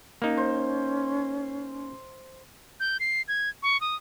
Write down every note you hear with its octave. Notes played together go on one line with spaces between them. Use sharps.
A#3 C#4 D#4
C5
G6
C7
G#6
C#6
D#6